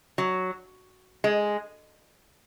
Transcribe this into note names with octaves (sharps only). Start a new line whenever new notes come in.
F#3
G#3